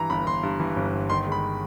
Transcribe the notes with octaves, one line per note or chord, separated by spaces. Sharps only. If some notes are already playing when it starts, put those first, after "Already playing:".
Already playing: G2 E3 A#5
G1 B5
G1 C6
G2
E3
G1
G1
D#3 C6
G#3
B5